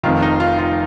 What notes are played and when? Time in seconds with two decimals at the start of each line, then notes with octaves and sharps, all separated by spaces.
0.03 F1 F2 D#3 F4
0.22 D#4
0.40 F4
0.59 F4